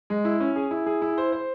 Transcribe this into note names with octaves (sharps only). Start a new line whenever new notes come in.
G#3
E4
C#4
G#4
E4
G#4
E4
C5
C5